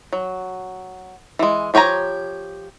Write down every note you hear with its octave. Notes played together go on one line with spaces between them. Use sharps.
F#3
E3 G#3
F3 G4 C#5 G#5 A#5